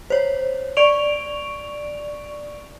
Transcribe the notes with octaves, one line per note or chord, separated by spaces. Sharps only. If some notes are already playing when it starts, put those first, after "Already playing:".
C5 C#5
D5 C#6 D7 F7